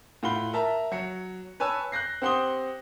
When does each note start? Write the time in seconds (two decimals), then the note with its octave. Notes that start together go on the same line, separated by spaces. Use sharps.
0.23 A2 F4 F#5 B5 G7
0.53 A#4 E5 A5 A#5
0.92 F#3 C#7
1.60 B4 C#5 G#5 A5 E6
1.92 F#6 G6 A#6 C7
2.22 C4 G4 F#5 C6 D#6 G7